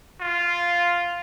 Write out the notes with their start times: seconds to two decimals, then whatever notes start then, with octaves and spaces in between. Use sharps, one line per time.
0.20 F4